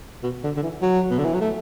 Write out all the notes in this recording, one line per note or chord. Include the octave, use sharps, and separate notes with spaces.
B2
D3
D3
E3
F#3
B2
D3
E3
F#3
A3